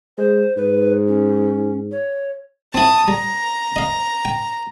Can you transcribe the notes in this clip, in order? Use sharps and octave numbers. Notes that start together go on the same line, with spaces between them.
G#3 C5
G#2 B4
C#4
C#5
C4 E4 A5 D#6
G3 A#5
D#5 F5
G5